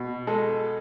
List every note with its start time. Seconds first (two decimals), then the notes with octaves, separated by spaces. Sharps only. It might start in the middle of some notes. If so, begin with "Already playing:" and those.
Already playing: B2
0.27 G#3 A4